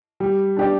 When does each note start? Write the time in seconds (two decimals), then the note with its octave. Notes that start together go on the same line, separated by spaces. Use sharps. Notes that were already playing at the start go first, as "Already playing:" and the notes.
0.20 G3
0.57 D4 G4 D5